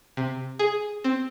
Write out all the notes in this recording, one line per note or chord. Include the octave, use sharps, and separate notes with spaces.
C3
G#4
C4